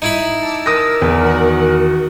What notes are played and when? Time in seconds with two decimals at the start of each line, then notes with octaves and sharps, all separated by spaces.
0.02 D#4 E4 B5
0.43 A5 D6 E6
0.66 A#4 D#6 A#6
1.02 E2 B4
1.22 D#3 F#4 F#5